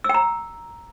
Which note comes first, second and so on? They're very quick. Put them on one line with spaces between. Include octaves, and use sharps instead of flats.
E6 G5 A#5